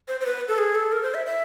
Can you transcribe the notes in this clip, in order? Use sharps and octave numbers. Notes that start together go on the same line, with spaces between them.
C5
C5
B4
A4
G#4
A4
A#4
C5
E5
E5